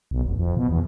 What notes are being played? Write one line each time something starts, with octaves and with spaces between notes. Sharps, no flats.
B1
F1
F2
B2
E2